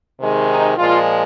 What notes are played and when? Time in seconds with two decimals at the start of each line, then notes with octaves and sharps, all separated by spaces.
0.19 C3 D#3 G#3
0.48 D#4
0.77 A#2 F3 G#3 F4